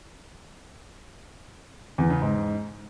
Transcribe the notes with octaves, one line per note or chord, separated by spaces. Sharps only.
E2
C#3
G#2